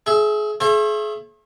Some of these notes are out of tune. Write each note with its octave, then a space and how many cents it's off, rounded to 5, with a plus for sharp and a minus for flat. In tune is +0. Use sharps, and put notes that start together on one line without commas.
G#4 +30 E5 +0
G#4 +35 C#5 -45 E5 +25